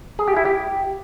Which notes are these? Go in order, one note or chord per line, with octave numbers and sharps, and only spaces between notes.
G#4
G4
E4
G4